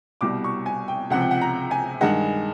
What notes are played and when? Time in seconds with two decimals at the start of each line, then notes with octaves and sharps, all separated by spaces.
0.21 C2 B2 G3 D6
0.44 C#6
0.66 G#5
0.88 G5
1.10 C#2 C3 F3 F#5
1.21 G5
1.31 F#5
1.41 A#5
1.71 G#5
2.01 G2 D#3 G#3 F#5